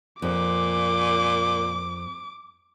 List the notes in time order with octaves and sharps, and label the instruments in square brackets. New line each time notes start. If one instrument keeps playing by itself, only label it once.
[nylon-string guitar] F2 [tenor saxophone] A#2 [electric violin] D6